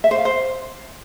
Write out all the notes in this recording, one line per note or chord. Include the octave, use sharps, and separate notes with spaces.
E5
C5
F5
C5